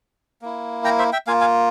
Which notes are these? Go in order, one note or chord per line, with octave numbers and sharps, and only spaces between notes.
A#3 E4
G5 A#5
C5 E5
E5 G5
A#3 F4 F5 G#5
F5 G#5